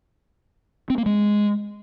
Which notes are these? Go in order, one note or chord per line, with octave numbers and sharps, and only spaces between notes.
C4
A#3
G#3